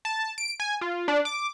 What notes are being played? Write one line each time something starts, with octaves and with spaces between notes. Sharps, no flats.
A5
D7
G#5
F4
D4
D6